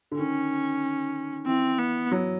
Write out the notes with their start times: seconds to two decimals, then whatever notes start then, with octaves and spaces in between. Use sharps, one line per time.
0.11 D3
0.18 D#3 C#4
1.47 E3 C4
1.79 B3
2.12 F#3